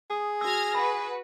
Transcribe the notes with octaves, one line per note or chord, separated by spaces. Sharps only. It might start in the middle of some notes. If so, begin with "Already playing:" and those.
G#4 D#6
F#4 E6 F6 G#6 A#6
F#4 B4 B5